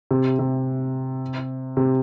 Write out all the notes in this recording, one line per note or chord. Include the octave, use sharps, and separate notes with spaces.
C3
C3
C3